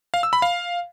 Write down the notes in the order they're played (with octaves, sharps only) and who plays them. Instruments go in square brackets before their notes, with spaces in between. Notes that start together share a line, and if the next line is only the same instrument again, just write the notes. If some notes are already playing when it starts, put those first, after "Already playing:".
[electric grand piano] F5
E6
B5
F5